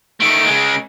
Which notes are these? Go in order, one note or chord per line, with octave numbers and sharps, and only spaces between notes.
D#3 A3 D7
C#3 G#3